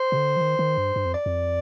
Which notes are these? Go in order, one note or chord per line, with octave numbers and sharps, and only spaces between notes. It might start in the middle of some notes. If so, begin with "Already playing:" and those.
Already playing: C5
C3
D3
F3
D#3
D#3
G2
G2
F2
D5
F2